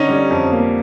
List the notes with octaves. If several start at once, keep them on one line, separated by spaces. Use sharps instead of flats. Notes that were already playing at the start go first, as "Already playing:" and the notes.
Already playing: D3 C#4 D#4
G3
F2
A#3